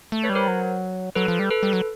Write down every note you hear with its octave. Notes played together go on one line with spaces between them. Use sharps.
A3
B4 C#5
G3
A#4 C5
F#3
F#3 A4 B4
F3
G3
A4 B4
G3
F#3